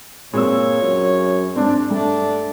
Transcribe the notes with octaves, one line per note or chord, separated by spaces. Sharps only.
A#2 G#3 C4 C#5 E6
F#2
G#2 C4 D4
G2 A3 D4